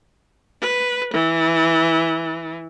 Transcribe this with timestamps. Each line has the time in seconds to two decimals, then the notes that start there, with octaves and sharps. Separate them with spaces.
0.62 B4
1.13 E3